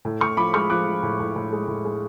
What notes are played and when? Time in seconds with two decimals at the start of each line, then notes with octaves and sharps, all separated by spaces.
0.05 A2
0.21 A2 C#6 F6
0.37 F3 B5 D6
0.54 G#3 C#6 F6
0.70 F3 D6 F#6
0.87 F3
1.03 A2
1.20 A2
1.36 A2
1.53 G#3
1.68 A2
1.85 G#3